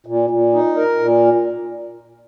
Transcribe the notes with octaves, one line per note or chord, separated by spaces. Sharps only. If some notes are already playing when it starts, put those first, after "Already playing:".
A#2
A#2
D#4
A#4
A#2